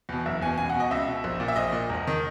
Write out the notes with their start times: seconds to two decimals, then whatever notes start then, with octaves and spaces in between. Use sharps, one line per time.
0.09 E2 B2
0.25 F#1 E5
0.42 E2 B2 G#5
0.58 C#2 G#5
0.69 F#5
0.74 B2
0.80 D#5
0.91 C#2 E5
1.08 B2
1.24 A#1
1.40 A#2
1.48 E5
1.56 A#1 D#5
1.72 A#2
1.89 E1
2.07 D#3